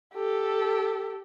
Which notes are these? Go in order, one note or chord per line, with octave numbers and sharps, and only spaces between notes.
G4 A4